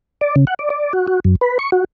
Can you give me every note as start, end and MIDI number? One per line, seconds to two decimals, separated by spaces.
0.21 0.36 74
0.36 0.45 49
0.47 0.54 78
0.59 0.70 74
0.70 0.93 74
0.93 1.07 66
1.07 1.20 66
1.25 1.36 42
1.41 1.58 71
1.59 1.70 85
1.72 1.84 66